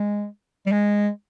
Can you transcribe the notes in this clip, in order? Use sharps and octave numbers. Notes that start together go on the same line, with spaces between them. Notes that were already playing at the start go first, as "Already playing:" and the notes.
Already playing: G#3
G3
G#3